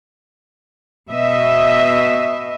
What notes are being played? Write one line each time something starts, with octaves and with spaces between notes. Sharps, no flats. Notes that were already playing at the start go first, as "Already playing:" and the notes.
B2 D#5 E5